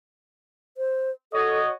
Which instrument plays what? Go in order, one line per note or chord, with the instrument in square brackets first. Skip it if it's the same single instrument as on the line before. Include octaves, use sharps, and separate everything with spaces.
[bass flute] C5
[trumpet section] F#4 C#5 D#5 [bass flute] A4